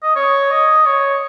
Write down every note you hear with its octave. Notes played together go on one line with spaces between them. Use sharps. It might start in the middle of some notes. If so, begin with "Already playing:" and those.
D#5
C#5
D#5
C#5